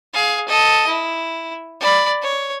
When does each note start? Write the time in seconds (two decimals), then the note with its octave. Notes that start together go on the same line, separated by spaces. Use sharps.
0.14 G#4 F5
0.48 A4 D#5
0.87 E4
1.80 D5 B5
2.22 C#5